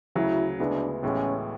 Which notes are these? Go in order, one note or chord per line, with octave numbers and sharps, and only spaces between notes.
D2 C#3 F#3 E4
D2 C#3 G#3 B3 D4 E4
A1 A2 G#3 B3 C#4